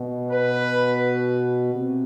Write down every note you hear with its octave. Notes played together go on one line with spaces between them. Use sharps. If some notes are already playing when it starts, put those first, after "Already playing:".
Already playing: B2
B4
C3